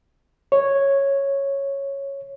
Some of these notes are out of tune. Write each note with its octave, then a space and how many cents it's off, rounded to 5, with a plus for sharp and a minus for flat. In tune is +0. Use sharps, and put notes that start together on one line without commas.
C#5 -5